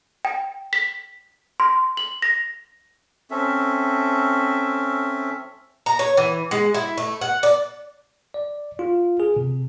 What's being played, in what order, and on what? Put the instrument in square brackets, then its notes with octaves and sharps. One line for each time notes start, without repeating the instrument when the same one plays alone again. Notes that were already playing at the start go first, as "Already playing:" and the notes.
[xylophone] G5
B6
C6
F#7
A#6
[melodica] C4 C#4 A4 E5
[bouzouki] A#5
C#5
E3
G#3
E4
A3
F#5
D5
[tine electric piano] D5
F4
G#4
C3